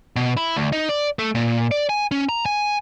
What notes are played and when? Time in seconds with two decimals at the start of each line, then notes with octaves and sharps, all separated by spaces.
0.16 B2
0.37 E4
0.56 D2
0.72 D#4
0.89 D5
1.19 A3
1.35 A#2
1.71 D5
1.89 G#5
2.11 C#4
2.29 A#5
2.46 G#5